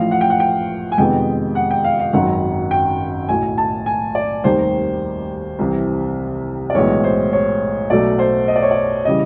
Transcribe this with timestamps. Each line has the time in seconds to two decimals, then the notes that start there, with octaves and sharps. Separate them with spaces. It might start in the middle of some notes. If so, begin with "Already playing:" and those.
Already playing: A1 A2 F3 F5
0.11 F#5
0.21 G5
0.30 F#5
0.40 G5
0.92 G#5
0.98 F2 C3 D#3 G#3 B3 G5
1.55 F#5
1.71 G5
1.84 F5
1.99 F5
2.13 G#1 F#2 D#3 F#3 F#5
2.71 G5
3.29 B1 A2 F#3 G#5
3.58 A5
3.86 G#5
4.15 D5
4.44 F1 D#2 D#3 G3 C5
5.59 C2 C3 E3
6.70 D5
6.74 B1 A2 E3 G#3 B3 C#5
7.04 C5
7.33 C#5
7.90 B1 B2 F#3 A3 D5
8.19 C5
8.48 D#5
8.56 D5
8.62 C#5
8.71 D5
9.05 C#3 E3 G3 D#5